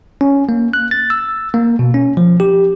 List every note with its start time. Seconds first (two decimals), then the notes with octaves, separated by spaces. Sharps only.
0.21 C#4
0.49 A#3
0.73 F#6
0.91 A6
1.10 E6
1.54 A#3
1.79 B2
1.94 C#4
2.17 F3
2.40 G4